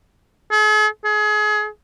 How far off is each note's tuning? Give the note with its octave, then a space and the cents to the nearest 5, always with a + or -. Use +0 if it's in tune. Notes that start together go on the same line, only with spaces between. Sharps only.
G#4 +45
G#4 +30